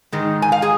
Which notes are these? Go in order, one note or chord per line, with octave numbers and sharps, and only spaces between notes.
G#2 D#3 G#3 D#4
G#5
F5
G#4